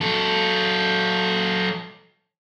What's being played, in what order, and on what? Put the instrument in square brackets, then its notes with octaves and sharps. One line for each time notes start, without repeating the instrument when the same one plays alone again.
[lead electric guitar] F#3 A4